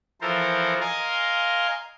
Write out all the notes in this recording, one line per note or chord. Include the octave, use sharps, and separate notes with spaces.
E3 F3 A4 A#4 C5
A#4 D#5 F5 G#5 C6